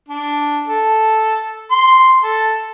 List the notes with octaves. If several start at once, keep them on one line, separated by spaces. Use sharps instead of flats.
D4
A4
C6
A4